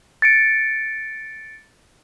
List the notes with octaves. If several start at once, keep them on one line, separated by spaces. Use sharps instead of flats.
A6 C#7 D7